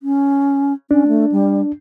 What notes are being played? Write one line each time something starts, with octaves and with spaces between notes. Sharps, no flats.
C#4
C#4 D4
A3
G3